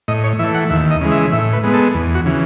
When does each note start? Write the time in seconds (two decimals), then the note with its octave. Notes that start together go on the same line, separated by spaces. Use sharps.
0.08 A2 D#5
0.24 C#5
0.39 E3 E5
0.43 A3
0.54 F#5
0.70 D#2 E5
0.91 D#5
1.01 C#3 E3 G#3
1.12 E5
1.32 A2 E5
1.53 B4
1.64 G#3 B3
1.73 A4
1.94 E2
2.15 F#4
2.26 C#3 E3